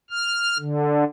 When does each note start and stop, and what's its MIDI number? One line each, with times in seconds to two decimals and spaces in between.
0.10 0.57 89
0.59 1.04 50